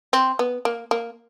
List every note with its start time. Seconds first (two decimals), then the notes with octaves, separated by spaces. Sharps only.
0.13 C4
0.39 B3
0.65 A#3
0.91 A#3